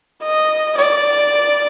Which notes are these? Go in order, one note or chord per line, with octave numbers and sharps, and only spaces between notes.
D#5
D5